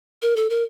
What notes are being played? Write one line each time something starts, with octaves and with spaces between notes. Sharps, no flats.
A#4
A4
A#4